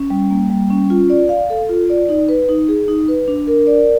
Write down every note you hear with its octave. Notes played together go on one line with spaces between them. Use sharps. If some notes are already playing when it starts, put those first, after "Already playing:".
Already playing: C#4
G3
A#3
G3
C#4
F4
D5
F5
A4
F4
D5
D#4
B4
D#4
G#4
D#4
B4
D4
A#4
D5